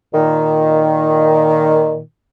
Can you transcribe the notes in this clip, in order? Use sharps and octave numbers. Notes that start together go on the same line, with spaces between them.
A#2 D#3